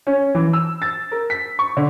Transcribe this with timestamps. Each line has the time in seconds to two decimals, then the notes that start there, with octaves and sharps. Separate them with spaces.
0.07 C#4
0.35 E3
0.53 E6
0.82 A6
1.11 A#4
1.30 B6
1.59 C#6
1.77 D3